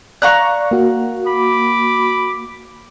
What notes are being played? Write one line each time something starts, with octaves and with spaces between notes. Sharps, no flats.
D5 F5 A#5 C#6 F#6
A#3 F#4
B5 D6